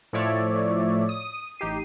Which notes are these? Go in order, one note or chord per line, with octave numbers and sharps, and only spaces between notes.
A2 F3 A3 C#5 D5 E5
D#6
A1 D#4 G4 C7 D#7